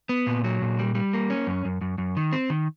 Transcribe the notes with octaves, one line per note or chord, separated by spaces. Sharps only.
B3
A#2
F#3
A#2
G3
G3
A#3
C#4
F#2
F#2
F#2
F#2
D#3
C4
D#3